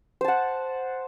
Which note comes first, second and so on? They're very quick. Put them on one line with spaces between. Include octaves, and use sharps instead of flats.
C5 A5 F#5